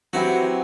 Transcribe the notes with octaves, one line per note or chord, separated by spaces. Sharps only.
F#3 C4 E4 F#4 G4 B4